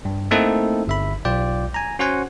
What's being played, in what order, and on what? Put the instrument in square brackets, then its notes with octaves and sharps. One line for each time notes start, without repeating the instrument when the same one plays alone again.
[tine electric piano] G2
A3 A#3 C4 D#4 E4 A4
G1 E5 B5
B1 F4 D5 G5
G#5 A#5
C#4 F#4 C5 F#5 G#5